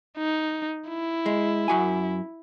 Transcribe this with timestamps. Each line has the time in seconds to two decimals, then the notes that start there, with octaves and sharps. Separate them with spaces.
0.18 D#4
0.89 E4
1.26 G#3
1.68 F#2 F#4 G#5